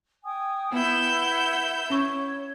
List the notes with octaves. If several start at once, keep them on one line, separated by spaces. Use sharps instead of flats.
G5 G#5 D#6
B3 E4 B4 F#5 E6 G6
C#4 C#5 C#6